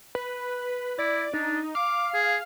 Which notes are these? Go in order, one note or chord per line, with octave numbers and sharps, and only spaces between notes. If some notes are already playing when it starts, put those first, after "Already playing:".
B4
E4 D5
D4 D#4
F5 D6
G#4